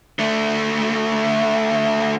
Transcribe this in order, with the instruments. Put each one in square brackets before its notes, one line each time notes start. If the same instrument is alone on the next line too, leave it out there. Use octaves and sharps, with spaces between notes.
[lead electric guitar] D3 A3